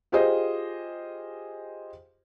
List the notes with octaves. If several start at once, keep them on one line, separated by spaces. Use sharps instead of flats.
F4 G4 G#4 C5 D#5